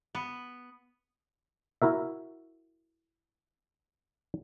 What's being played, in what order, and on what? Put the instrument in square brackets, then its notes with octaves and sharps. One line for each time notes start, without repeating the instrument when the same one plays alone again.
[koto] B3
[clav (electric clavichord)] E4 F#4 A#4 E5